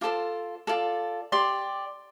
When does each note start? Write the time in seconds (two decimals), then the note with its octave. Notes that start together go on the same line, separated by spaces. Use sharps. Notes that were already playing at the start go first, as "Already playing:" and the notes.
0.01 F4 A4 C5 D6
0.67 F4 A4 D5
1.32 G4 D5 C6